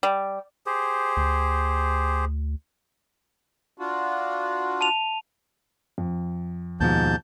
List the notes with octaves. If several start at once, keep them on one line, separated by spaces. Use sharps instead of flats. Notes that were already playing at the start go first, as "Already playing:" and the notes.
G3
G4 G#4 C5
D2
D4 F4 F#4
A5 D#7 F7
F2
D#2 G#2 B2 F3 A5 G6